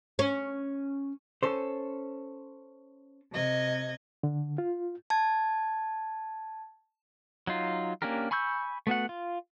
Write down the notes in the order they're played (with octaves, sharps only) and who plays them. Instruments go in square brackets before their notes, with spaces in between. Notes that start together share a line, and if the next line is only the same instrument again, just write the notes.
[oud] C#4
[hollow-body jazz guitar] C#4 A4 C5
[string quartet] C3 D#5 G#6
[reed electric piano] D3
F4
[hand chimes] A5 G#6
[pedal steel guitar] F#3 D#4 F4
A#3 C#4 D4 G4 A#4
G#5 B5 C#6 E6 G6
A3 B3 F#4 F#5
F4